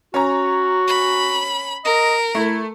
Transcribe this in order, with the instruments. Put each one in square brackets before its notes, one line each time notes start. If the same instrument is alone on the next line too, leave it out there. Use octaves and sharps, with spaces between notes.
[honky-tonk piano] C#4 A#5 [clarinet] F#4
[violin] B5
[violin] A#4 [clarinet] D#5
[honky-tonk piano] A3 [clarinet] E4